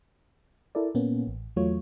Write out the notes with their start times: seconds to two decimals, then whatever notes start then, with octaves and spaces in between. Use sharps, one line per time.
0.75 E4 A4 A#4 D5
0.95 A#2 A#3 B3 C#4
1.27 A1
1.56 E2 F#3 A3 F4 C#5